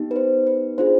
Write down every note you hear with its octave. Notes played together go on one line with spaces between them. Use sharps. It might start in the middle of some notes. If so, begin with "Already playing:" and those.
Already playing: B3 D#4 G4
B4
C5
B4
D4 F4 G#4 C5